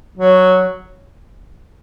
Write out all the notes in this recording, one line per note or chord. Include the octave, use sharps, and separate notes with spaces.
F#3